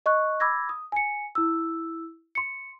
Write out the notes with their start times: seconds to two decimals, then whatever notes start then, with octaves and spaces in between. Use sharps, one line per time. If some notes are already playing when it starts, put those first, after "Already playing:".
0.06 D#5 C#6 F#6
0.40 B5 D6 E6 G#6 A#6
0.69 D#6
0.92 G#5 C#7
1.35 E4 E6
2.35 C6 C#7